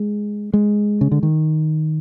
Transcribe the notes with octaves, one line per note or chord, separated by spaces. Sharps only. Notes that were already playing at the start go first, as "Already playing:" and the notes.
Already playing: G#3
G#3
C#3
D3
D#3